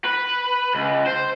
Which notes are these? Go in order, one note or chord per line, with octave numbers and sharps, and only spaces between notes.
B4
C#2
C5